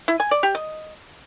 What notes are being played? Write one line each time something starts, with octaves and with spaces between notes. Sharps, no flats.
E4
G#5
D5
G4
D#5